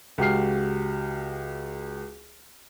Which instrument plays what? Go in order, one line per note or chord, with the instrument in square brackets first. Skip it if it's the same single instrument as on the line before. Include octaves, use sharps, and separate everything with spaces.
[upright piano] C#2 F#4 G4 F6 C7